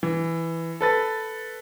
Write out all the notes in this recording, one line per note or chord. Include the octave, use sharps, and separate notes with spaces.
E3
A4 B4 A6